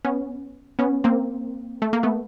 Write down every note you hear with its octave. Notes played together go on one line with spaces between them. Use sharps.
B3 C#4
B3 C#4
A#3 C4
A3
A#3
A3 B3